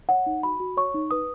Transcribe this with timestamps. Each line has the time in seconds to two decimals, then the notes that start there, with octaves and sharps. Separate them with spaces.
0.09 C#5 F#5
0.26 D#4
0.43 F#4 B5
0.60 F#4
0.77 C#5 C#6
0.94 D#4
1.11 B4 D#6